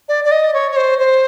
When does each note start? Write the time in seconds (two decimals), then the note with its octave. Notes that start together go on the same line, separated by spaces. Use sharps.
0.09 D5
0.25 D5
0.32 D#5
0.54 C#5
0.72 C#5
0.76 C5
0.99 C5